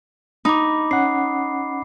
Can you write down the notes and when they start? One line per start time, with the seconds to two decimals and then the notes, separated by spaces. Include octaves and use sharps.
0.45 D#4 B5 D6
0.91 C#4 F#5 C7